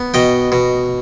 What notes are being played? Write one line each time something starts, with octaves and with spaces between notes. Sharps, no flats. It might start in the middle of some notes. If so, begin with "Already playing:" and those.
Already playing: B3
B2 D#5 G5
B2